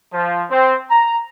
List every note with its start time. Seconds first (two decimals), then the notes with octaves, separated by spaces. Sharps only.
0.13 F3
0.50 C4
0.90 A#5